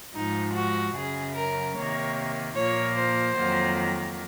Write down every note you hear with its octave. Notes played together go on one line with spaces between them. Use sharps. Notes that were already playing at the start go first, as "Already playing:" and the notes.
G#2 F3 G#3 D#4
F#4
F#2 C#3 F#3 G#4
A#4
C3 D#3 A#3 C#5
A#2 F3 A#3 C#5
C5
F2 D#3 F#3 A#3